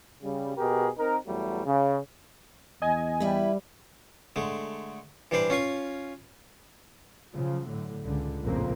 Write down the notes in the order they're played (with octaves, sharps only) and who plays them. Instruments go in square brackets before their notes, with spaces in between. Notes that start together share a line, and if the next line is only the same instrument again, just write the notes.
[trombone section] C#3 G3
B2 G4 G#4 A#4
C4 D#4 A#4
E2 F#3 G3 A3
C#3
[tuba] E2 [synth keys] D#5 G#5
[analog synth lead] G3 [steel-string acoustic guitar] E4 B4
[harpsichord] D3 G#3 A3
E3 G3 D4 C5 D5
C#4 F4 F5 G#5
[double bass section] C#3 F3 F#3
A2 D3
C#2 D3
A#1 F2 A2 C#3 A#3 C4